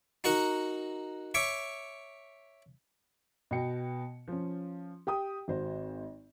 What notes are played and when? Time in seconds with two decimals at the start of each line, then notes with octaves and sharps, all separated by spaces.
0.24 D#4 F#4 A#4 F#5
1.34 C#5 E5 C#6 D6
3.51 B2 B3 F#4 G5 C#7
4.28 F3 C#4
5.07 G4 G5 D#6
5.48 G#1 F#4 C5